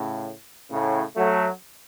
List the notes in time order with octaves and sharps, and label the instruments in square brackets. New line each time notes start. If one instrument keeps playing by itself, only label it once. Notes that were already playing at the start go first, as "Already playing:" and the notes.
Already playing: [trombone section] A2 C#3
A2 C#3
F#3 A3